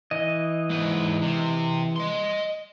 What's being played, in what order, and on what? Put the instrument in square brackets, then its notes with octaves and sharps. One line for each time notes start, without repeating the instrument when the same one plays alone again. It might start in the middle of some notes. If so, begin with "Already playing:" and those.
[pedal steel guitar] E3 D#5
[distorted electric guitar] G#2 B4
C3
D#5 C6